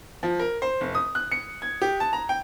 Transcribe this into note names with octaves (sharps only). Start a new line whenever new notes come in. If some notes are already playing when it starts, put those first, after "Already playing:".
F3
A#4
C5
F1
D#6
F#6
C#7
G#6
G4
A5
A#5
G5